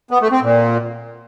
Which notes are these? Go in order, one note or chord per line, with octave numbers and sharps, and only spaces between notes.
B3
A3
C4
A#2